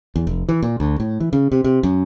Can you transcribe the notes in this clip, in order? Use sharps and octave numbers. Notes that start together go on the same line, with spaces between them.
E2
F1
E3
A#2
D2
A2
E3
C#3
C3
C3
F#2